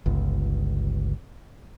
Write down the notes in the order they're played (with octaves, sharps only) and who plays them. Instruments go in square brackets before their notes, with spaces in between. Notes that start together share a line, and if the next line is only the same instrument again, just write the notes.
[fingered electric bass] G1 C#2